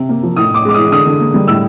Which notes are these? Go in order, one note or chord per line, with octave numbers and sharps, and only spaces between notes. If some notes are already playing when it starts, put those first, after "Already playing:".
Already playing: C3
A#3
F3
A2 D#6
A2 D6
G#3 D6
E3 D#6
D3 D#6
D3
A#3
G3
A2 E6